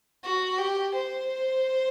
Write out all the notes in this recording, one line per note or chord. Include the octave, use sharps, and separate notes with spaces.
F#4
G4
C5